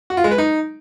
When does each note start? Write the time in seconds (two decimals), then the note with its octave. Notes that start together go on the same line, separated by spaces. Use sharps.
0.10 F#4
0.17 F4
0.24 G#3
0.31 B4
0.38 D#4